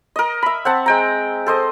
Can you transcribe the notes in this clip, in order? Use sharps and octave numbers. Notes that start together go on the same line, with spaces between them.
A#4 D#5
E5 B5
C4 F#5 A5
G#3 G5 A#5
A4 C5 D#5